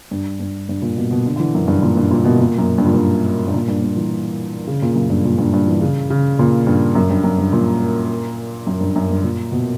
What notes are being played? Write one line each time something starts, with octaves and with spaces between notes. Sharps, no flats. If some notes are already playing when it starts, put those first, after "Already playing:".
G2
G2
G2
A#2
B2
B2
D3
D3
E3
F#2
G2
A#2
G2
A#2
B2
A#2
F#2
G2
A#2
G2
G2
A#2
G2
G2
E3
C#3
A#2
F#2
G2
A#2
G2
G2
E3
C#3
C#3
A#2
G2
F#2
G2
F#2
G2
A#2
F#2
G2
F#2
G2
A#2
B2